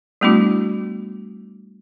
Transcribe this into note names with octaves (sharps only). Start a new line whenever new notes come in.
G3 A3 B3 D4 E4 F#4